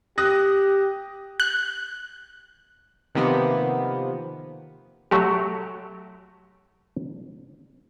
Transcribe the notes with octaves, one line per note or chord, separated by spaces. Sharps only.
G4 D#6 F#6 A#6
F#6
C3 D#3 F3 A#3 B3
F#3 A3 F#4 G4